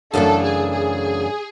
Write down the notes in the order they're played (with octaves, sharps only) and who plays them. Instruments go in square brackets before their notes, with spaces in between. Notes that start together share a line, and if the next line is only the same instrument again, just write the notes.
[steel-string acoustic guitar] F#2 C#3 E3 A3 D4 [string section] A4
[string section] G#4
G#4